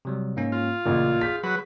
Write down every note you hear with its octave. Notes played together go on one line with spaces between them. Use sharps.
C3 F#3 G3
G#2 A#3 C#4
F4
A1 A#2 C#3
G#4 G6 B6
F#3 B4